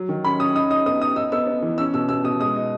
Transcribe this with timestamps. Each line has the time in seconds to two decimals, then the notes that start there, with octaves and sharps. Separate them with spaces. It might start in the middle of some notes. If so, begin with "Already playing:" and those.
Already playing: F#3
0.09 D#3
0.24 C#4 B5
0.40 C#4 D#6
0.55 D#4 D#6
0.70 D#4 D#6
0.86 B3 D#6
1.01 D#4 D#6
1.16 D#4 E6
1.32 B3 E6
1.47 B3
1.62 E3
1.78 C#4 E6
1.94 B2 E6
2.09 B2 E6
2.24 B2 D#6
2.39 G#3 D#6
2.56 D#4